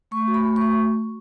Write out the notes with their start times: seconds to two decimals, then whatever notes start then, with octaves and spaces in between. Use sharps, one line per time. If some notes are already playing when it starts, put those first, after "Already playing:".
0.11 A3 C#6
0.28 F#4
0.34 B5
0.45 A3
0.56 C#6
0.62 F#4